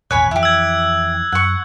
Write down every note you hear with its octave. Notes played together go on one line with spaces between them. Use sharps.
D#1 G#1 E2 C#5 G#5 B5 F#6
F2 E3 E4 G4
E6 G#6
F#2 F#5 C#6